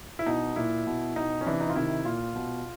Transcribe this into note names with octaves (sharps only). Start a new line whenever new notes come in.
E4
B2 D#4
A#2 E4
B2
B2 D#4
C#4
C3 E3 D4
D#4
F4
C3 D#3 E4
A#2 F4
B2